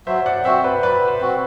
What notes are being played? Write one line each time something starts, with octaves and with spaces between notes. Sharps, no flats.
F#3 C5 E5
D5 F#5
C4 F#4 C5 E5
B4 D5
F#3 B4 D5
C5
C4 F#4